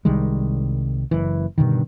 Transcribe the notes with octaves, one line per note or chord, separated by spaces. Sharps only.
C2 D#3 G3 G#3
F#1 E3
G2 B2 D3 D#3